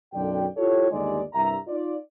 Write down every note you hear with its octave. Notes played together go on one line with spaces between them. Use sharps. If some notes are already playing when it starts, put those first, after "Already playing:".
B1 F#2 D3 F#4 D5 G5
E4 F4 G4 A4 C#5
G1 D#2 G#3 D#4 D5
C2 G2 E5 A#5
D#4 F4 D5